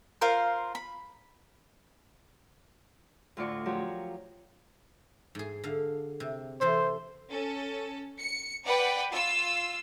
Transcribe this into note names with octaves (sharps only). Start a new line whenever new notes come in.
F4 A#4 C5 F5
B5
D2 A2 F4 D5 C#6
F3 F#3 F#4 G4 A#4 C#5
G#2 G#4
D3 F5
C3
C3 E3 A4 C5
C#4 A4
C#7
B4 D5 F#5 G5
F4 E6